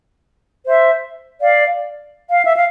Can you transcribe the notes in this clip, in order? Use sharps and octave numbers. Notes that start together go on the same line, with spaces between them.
C5 E5
D5 F5
F5
E5
F5